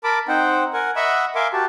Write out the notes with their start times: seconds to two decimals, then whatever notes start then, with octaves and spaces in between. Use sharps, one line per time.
0.04 A#4 A5 B5 D6
0.28 C4 D#4 C5 F#5 G5
0.73 A#4 F#5 G#5
0.96 D#5 E5 F#5 B5 C#6 E6
1.35 A#4 E5 F5 G#5 C6 D6
1.53 F#4 G4 A5